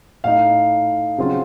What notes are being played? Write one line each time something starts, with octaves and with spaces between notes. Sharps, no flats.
A2 A3 D#4 F5
C#3 F#3 C4 F4